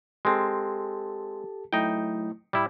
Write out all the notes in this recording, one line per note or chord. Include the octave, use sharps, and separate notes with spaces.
G#3 C4 G4 A4 A5
F#3 A3 D#4 E4 G5
A2 G3 E4